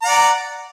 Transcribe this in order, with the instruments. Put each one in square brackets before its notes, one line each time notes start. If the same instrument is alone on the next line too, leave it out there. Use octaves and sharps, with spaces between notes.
[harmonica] A#5
F#5
D5